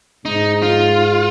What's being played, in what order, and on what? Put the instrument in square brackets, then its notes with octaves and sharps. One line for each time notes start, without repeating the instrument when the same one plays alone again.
[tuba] G#2 [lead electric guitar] D#4
[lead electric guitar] F4